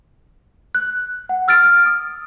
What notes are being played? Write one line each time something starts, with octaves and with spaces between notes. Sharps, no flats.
F#6
F#5
E6 F6 A6 D7
F6
D#6